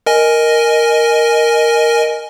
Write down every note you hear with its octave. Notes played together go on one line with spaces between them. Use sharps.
A#4 D#5 G#5